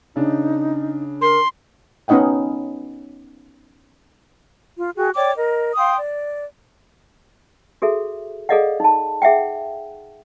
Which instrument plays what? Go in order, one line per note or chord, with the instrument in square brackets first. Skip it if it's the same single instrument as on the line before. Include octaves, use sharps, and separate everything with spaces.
[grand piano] C#3 D4 [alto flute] D#4
[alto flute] A#4 [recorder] C6
[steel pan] B3 C#4 D#4 D#5 F#5 G5
[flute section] F4
F#4 G#4 G5
C#5 D5 G5 D6
A#4 D#5
F5 G5 C6 D#6
D5
[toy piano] F#4 G#4 A4 E5
G#4 A4 D5 D#5 F5 F#5
D#4 A5
G#4 E5 F#5 G5